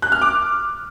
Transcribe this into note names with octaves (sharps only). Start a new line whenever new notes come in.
F#6
F6
D6